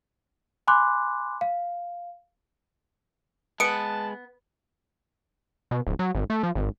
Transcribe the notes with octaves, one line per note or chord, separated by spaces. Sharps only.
G#5 B5 C6 D6 F#6
F5
G#3 B3 B4 A5 C#7 D7
B2
D1
F#3
G#1
A3
F3
G#1